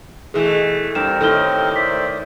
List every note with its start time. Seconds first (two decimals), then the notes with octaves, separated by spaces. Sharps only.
0.34 B2 E3 A3 G#4
0.95 G2 C4 G4 A#4 E7
1.21 A2 D#3 A4 F6 G7
1.76 C5 D5 E5 B6